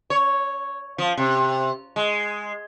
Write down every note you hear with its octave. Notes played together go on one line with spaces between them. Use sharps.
C#5
F3
C3
G#3